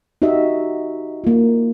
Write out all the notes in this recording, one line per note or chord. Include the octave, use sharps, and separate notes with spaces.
D#4 F#4 G4 D#5 E5
A#3 F4